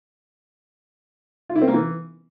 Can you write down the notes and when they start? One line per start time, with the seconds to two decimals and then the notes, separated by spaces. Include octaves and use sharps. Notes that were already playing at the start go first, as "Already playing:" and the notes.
1.50 F4
1.56 E4
1.62 C4
1.68 A#3
1.74 E3